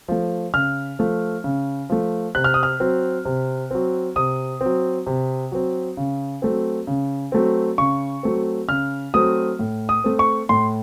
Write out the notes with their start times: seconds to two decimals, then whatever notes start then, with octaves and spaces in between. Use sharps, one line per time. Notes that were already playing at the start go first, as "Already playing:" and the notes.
0.08 F3 A3
0.54 C#3 F6
0.99 F3 A3
1.44 C#3
1.90 F3 A3
2.35 C3 F#6
2.44 F6
2.54 D#6
2.63 F6
2.80 F#3 C4
3.25 C3
3.71 F#3 C4
4.16 C3 D#6
4.61 F#3 C4
5.07 C3
5.52 F#3 C4
5.97 C#3
6.42 F#3 A3 C4
6.87 C#3
7.32 F#3 A3 C4
7.78 C#3 C#6
8.23 F#3 A3 C4
8.68 C#3 F6
9.14 F#3 A3 C4 D#6
9.59 A2
9.89 D#6
10.04 A3 C4
10.19 C#6
10.49 A2 C6